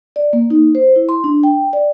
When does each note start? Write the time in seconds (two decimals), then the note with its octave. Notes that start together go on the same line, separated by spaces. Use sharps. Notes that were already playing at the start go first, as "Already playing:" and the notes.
0.16 D5
0.33 A#3
0.50 D#4
0.75 C5
0.96 E4
1.09 C6
1.24 D4
1.43 G5
1.73 D5